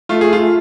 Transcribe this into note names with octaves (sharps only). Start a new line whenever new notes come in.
A3 F4
A3 G#4
F4
A3